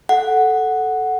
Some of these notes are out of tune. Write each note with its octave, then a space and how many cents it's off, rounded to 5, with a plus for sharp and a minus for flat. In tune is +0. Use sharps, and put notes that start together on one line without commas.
A4 -5 F#5 +0